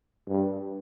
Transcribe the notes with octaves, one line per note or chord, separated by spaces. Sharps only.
G2